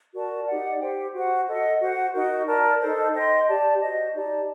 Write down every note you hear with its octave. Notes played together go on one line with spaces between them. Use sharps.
F#4 A#4 D5 A5
D#4 G4 D5 F#5
G4 C5 G5
F#4 C5 F#5
A4 D#5 F#5
F#4 C5 F#5
D#4 F#4 A#4 D#5
A#4 D5 A5
D#4 A4 C5
C5 D#5 G5 C6
G4 D5 A5
F#4 C5 D#5
D#4 G4 D5 A5